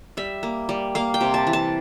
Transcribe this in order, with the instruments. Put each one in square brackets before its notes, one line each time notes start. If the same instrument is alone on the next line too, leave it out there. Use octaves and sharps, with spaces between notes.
[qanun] G3 E5
A#3
G3
A#3 F5
G5
C3
A5
E3
A5